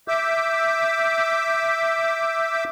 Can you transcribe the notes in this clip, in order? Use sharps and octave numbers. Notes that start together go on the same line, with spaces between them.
E5 D6 E6 G6